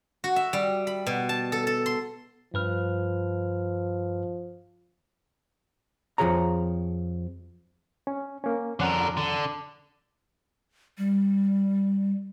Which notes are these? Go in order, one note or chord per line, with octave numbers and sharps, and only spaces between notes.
F#4
E5
G3
B5
B2
A5
A4
A4
C6
G2 F3 B4 F6
F2 F3 G4 G#4 C#5 A#5
C#4
A#3 C#4
F2 D3 C#4 A#4 F#5
D3
G3